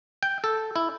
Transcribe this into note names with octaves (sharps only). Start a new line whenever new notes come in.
G5
A4
E4